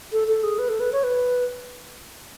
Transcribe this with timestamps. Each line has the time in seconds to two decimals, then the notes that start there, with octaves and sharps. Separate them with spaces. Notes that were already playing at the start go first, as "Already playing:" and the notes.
0.12 A4
0.28 A4
0.43 G#4
0.59 B4
0.69 A4
0.80 B4
0.93 C#5
1.04 B4